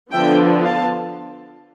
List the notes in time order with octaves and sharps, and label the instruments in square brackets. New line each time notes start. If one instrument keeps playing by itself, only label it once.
[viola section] D3 F3 B3 D4 E5 G5
F5 A5